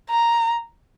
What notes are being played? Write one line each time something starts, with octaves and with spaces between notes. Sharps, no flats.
A#5